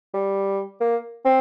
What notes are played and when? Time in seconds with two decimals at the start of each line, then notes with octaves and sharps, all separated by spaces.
0.14 G3
0.81 A#3
1.25 C4